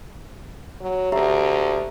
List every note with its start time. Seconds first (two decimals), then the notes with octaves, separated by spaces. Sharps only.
0.81 F#3
1.12 D2 G4 E5 A#5